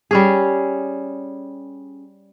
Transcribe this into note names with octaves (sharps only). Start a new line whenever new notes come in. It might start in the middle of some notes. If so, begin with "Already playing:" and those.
G3 C#4 G#4